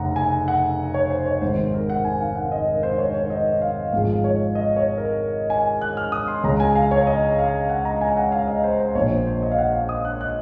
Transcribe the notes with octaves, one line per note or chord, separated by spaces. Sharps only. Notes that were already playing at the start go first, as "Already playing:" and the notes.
Already playing: F1 C#3 F#5 A#5
G#5
F#5
C#5
C5
C#5
G#1 G#2 D#3 C5
C5
A#4
F#5
G#5
F5
F#5
D#5
A#4
C5
C#5
C#5
D#5
F5
G#1 G#2 F3 G#3 F5
C#5
D#5
C#5
A#4
G#5
F#6
F6
D#6
C6
C#2 C#3 G#3 A#5
G#5
F5
C#5
D#5
F5
F#5
A#5
G#5
F#5
F5
D#5
C5
C5
A#1 A#2 F3 C#5
C5
C5
D#5
F5
F#5
F5
D#6
F#6
F#6